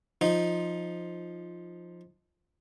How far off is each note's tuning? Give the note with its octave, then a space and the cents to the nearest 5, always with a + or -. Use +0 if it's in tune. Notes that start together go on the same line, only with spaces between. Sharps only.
F3 +0 D#4 +0